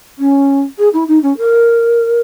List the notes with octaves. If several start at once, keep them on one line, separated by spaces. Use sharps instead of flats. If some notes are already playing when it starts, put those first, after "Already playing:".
C#4
G#4
E4
D#4
C#4
A#4